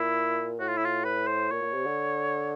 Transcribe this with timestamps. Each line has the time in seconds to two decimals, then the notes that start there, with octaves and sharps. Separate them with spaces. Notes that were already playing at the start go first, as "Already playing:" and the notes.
Already playing: A#2 E4
0.59 A2 F#4
0.68 F4
0.77 E4
0.85 F4
1.04 B4
1.27 C5
1.51 A#2 C#5
1.62 A#2
1.74 C3
1.85 D3